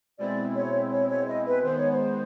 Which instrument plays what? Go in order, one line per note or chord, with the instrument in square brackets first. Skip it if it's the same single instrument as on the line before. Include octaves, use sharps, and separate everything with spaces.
[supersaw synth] B2 G#3 C4 E4 [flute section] D5
[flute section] C#5
C#5
C#5
D#5
B4
[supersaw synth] D#3 G#3 B3 [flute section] C5
[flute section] C#5
C5